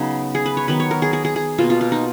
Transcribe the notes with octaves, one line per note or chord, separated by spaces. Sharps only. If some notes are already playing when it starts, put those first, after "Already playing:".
Already playing: C#3 F#3 B3 D#4
G#4
B4
C#5
D#3 F#3 B3 B4
C#5
A#4
G#4
G#4
G#4
G#4
B2 A#3 F4
F4
F4
D#4